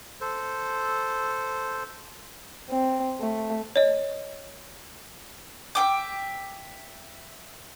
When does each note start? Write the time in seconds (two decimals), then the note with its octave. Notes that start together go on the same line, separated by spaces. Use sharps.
0.21 A4 C5
2.70 C4
3.20 A3
3.76 C#5 D#5
5.75 E5 G5 D6